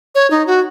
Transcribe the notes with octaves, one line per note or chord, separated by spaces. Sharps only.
C#5
D#4
F#4